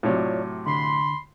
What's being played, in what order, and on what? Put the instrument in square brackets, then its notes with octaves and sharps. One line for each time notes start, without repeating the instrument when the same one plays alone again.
[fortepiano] A2 C3 F#3 [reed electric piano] F4 C#5 D5
[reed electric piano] C2 D3 [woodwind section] B5 C6